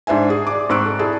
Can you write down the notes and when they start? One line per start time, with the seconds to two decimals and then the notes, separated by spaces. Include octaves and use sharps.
0.07 G#2 D4 C5 E5 G#5
0.30 G#4
0.47 D5 D6
0.69 G#2 C4 C#6 E6 F#6 D7
0.86 A4
0.99 E4 G#4 A4 D5